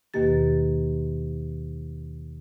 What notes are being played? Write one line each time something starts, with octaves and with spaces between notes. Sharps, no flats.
D#2 B2 D#3 A#3 G4 A6